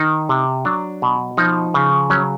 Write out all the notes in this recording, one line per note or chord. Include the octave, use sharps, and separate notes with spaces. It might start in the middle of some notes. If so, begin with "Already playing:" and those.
Already playing: D#3 D#4
C3
F#3 D4
B2
F3 D#4
C#3
F#3 C#4